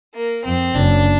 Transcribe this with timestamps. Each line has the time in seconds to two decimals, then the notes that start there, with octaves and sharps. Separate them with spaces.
0.14 A#3
0.44 F2 C4
0.74 F#1 F#2 D4